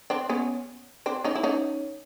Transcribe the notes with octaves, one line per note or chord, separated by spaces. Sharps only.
C4 D4
B3 C#4
C4 D4
C#4 D#4
E4
C#4 D#4